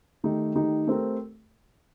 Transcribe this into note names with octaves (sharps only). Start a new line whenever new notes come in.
D#3 A3 D#4 G4
D#3 A3 D#4 G4
A3 C4 G4 A#4